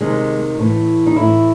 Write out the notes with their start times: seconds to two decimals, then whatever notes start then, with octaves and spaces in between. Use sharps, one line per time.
0.01 C3 D#3 G#3
0.59 A2 E3
1.07 D#4
1.16 A2 E3 E4